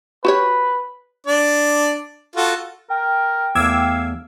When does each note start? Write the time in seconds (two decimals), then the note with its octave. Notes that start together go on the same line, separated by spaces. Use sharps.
0.25 F#4 G4 B4 C#5
1.27 D4 D5
2.36 F4 F#4 A4
2.90 A#4 G5
3.55 E2 A3 F5 D6 E6 G#6